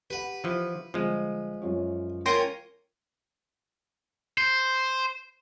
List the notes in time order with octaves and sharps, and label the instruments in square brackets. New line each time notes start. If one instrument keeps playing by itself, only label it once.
[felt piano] G4 F#5 [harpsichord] B4
[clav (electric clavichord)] E3 F3
[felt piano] G1 [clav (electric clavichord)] F3 G#3
[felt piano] F#2 F4 C#5
[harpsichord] A#3 C#4 F4 [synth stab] G5 C6 A#6
[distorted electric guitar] C5